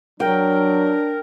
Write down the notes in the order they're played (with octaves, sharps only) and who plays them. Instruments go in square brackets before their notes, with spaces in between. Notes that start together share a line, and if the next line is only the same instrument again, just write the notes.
[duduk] F#3 [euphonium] D4 [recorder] A#4 [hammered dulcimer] G5